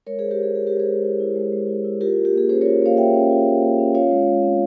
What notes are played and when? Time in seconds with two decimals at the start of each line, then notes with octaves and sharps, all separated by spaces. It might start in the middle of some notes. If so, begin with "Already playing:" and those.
0.07 G#3 A#4 C#5
0.19 G#3 G#4 C5
0.31 G4 A#4
0.39 E4 G#4
0.55 E4 G#4
0.67 G#3 G4 A#4
0.79 G#4 C5
0.88 G#3
1.04 E4
1.20 E4
1.36 G#3
1.52 G#3
1.69 E4
1.85 E4
2.01 F4 G4 A#4
2.17 A#3
2.25 G4
2.33 A#3 G#4
2.49 C#4 G#4 C5
2.61 F4 A#4 C#5
2.82 A#3 C#5 F5
2.97 A#3 E5 G5
3.14 C#4
3.31 F4
3.46 A#3
3.62 A#3
3.79 C#4
3.94 F4 C#5 F5
4.11 G#3
4.27 G#3
4.43 C4